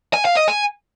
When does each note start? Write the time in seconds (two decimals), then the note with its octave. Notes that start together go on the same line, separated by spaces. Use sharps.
0.14 G#5
0.25 F5
0.36 D#5
0.48 G#5